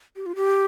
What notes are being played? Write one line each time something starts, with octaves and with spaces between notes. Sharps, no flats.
G4
F4
G4